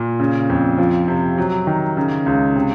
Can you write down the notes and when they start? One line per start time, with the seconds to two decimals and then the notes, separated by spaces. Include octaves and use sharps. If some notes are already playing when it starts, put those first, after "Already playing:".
Already playing: A#2
0.20 C#3
0.50 F2
0.78 F3
1.08 C3
1.38 F#3
1.67 D#3
1.97 C#3
2.26 C#2
2.55 C3